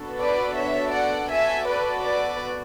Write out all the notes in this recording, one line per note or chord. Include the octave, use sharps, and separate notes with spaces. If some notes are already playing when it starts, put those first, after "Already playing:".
Already playing: B3 D4 F#4 A4
B4 D5
C#5 E5
D5 F#5
B3 F#4 A4 E5 G#5
B4 D5
B4 D5